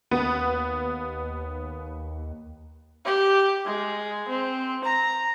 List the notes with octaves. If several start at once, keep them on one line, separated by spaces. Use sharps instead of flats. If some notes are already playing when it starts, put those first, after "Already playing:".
D#2 B3
G4
G#3
C4
A#5